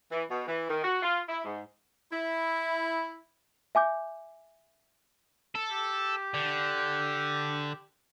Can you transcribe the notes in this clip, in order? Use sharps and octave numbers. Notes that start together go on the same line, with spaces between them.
E3
B2
E3
D#3
F#4
F4
E4
G#2
E4
E5 G#5 D6 G6
A4
G4
D3